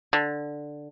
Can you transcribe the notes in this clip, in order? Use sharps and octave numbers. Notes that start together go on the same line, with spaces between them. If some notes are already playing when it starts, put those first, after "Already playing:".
D3